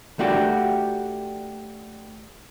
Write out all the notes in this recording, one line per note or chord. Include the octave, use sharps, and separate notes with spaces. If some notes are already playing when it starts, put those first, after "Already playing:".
A3 D4 F#4 G4